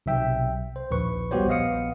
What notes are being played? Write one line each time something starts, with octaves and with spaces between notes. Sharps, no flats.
B1 C3 E5 G5
C5
A#1 D#2 B4 C#6
G3 B3 F#4 G4 C5 C#5
A#1 B3 D#5 F5 D#6 C#7